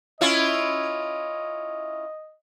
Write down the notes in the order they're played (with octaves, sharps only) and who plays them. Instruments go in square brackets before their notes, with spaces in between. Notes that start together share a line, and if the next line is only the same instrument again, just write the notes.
[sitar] C#4 E4 F4 [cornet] D#5